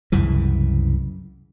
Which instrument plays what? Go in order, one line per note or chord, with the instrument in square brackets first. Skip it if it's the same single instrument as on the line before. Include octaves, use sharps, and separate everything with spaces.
[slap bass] C2 F#2 C#3 E3